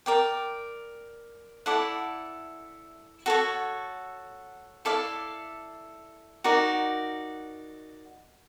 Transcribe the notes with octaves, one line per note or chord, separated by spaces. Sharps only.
A#4 D5 G5
E4 A4 D5 F#5
F#4 A4 C#5
E4 A4 D5 F5
D#4 F#4 A#4 D5